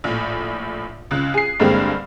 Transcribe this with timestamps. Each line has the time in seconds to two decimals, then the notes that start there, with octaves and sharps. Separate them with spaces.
0.04 A#1 A2
1.11 C#2 C#3 F#6
1.34 G#4 C7
1.60 G2 D3 G#3 A#3 C4